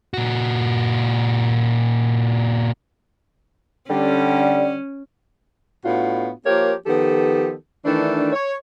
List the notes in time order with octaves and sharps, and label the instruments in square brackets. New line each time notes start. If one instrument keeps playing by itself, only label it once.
[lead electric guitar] A#2 F#4
[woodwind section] D3 G3 [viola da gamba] C#4
[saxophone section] A2 B3 D4 F4 F#4
F3 A#3 G4 A#4 C#5
D#3 F3 B3 G4 A4
D#3 E3 A3 D4
C#5